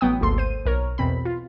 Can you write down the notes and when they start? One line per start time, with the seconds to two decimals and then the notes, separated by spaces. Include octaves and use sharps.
0.01 A1 F#3 B3 G5 D#6
0.21 G#1 D2 A#3 A4 C6
0.38 C5 D#7
0.66 B1 A#4 C#5
0.98 E2 B2 C4 B5
1.25 F4